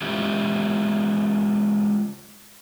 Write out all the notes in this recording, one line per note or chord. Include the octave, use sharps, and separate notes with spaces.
G#3 C#4 E4 F4 G4